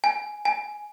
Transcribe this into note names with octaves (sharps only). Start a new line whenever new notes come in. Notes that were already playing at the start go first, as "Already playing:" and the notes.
G#5
G#5